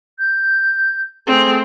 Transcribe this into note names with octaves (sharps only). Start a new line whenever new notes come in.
G6
A3 C4 G#4